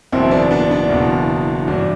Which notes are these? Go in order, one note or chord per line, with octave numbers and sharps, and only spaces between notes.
F#1 E2 B2 C4 E4
B3 D4
B3 D4
B3 D4
F#1 E2 B2
G1 G2 E3 D4 F#4